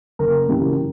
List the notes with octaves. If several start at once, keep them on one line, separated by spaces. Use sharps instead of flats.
F#1 A#4
F#2 C#3 E3 G4